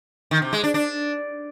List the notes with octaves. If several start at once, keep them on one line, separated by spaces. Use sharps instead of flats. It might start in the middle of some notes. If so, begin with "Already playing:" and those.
D#3
C3
G#3
D4
D4